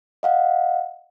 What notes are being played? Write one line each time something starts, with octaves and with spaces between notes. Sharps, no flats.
D#5 F5 F#5